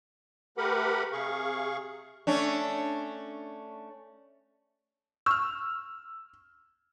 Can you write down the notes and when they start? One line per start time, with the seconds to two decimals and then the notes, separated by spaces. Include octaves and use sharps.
0.58 A3 G4 A#4 B4 F#5 B5
1.13 C3 G#4 F5 C#6
2.27 A3 C#4 D4
5.26 C#6 E6 F6